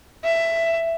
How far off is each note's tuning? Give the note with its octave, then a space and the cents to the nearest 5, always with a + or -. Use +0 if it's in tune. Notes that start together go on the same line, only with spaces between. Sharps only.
E5 +10